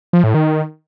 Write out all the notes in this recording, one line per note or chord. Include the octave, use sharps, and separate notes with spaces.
F3
A2
D#3